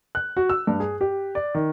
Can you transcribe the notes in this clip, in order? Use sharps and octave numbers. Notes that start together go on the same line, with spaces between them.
F#6
F#4
E6
G2
G#4
G4
D5
D#3